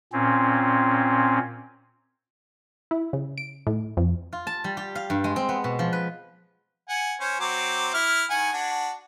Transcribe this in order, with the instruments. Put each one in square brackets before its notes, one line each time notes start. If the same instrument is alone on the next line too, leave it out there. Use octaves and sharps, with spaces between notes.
[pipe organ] A#2 C4 C#4
[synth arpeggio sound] E4
C#3
D7
A2
F2
[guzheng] F4
A5
G3
G4
F5
G2
G#3
C4
B3
B2
F3
B4
[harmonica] F#5 G#5
C#4 C5
F#3 C4 D6
E4 F6
D#3 F#5 G#5
D4 F#4